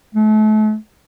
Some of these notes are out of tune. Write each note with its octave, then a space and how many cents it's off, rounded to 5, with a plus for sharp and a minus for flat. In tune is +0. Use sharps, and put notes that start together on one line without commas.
A3 -35